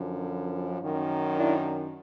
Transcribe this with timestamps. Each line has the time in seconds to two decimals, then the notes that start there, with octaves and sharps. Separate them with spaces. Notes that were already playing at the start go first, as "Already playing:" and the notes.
Already playing: F#2 D3 F3
0.80 F#2 D#3
1.36 D4 E4